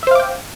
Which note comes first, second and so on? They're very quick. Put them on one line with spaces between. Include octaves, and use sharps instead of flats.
E5 C5 F5 D6 G5